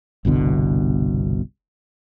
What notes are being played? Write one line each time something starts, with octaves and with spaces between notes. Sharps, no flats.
G1 C2 B2 D3